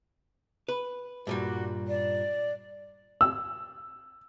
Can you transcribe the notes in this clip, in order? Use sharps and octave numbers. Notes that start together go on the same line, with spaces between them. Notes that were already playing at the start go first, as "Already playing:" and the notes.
B4
G2 A#2 G3 F#4
D5
E6